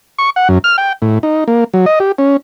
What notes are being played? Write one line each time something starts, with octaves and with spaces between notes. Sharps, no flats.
C#6
F#5
F#2
F6
G5
A2
D#4
A#3
F#3
D#5
G4
C#4